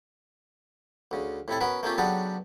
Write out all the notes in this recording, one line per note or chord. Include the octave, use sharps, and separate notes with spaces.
D2 C#3
A2 C3 E4 A4
B3 C#4 F#4 A#4 B4
A3 A#3 C4 C#4 F4 G4
C#3 F#3 B3 D4 G4 A4